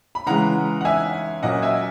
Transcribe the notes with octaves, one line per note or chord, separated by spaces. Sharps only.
B5
C#3 E3 G#3 F#5 A#5
F#5
E5 G#5
A#2 F#3 C#4 D#5 F#5
E5 G#5